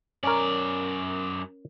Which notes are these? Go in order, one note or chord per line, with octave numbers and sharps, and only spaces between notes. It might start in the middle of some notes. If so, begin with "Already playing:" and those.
F#2 C#4 A#4 D5